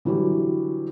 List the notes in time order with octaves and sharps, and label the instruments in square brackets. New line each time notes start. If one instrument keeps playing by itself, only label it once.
[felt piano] D3 E3 F#3 G3